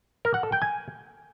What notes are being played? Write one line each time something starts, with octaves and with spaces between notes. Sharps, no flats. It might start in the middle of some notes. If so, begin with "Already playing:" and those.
A#4
F#5
A4
G5
G#5